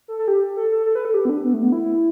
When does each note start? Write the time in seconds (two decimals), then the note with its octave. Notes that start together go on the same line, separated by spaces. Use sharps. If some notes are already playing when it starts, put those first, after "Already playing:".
0.08 A4
0.19 A4
0.28 G4
0.57 A4
0.72 A4
0.86 A4
0.95 B4
1.05 A4
1.14 G4
1.25 B3
1.29 D4
1.44 B3
1.54 A3
1.63 B3
1.72 E4